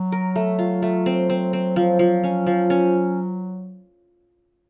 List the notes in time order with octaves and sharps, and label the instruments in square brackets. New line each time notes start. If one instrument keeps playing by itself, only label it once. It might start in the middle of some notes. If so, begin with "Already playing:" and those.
Already playing: [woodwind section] F#3
[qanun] A#4
A3
F4
A3
C4
C4
C4
F3
F3
C#4
F3
C#4